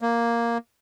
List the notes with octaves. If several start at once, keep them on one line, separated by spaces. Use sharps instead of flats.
A#3